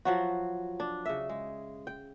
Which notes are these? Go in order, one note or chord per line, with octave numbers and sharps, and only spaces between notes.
F3 F#3 F#4
D4
C#3 E5
G#3
G5